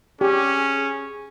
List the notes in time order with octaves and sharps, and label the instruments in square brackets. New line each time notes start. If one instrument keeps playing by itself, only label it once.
[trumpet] C#4 [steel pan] G4 [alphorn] G#4